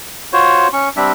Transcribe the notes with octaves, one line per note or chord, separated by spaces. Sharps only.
F4 F#4 C5 C#5
C#4 C#6
G3 C4 D4 E5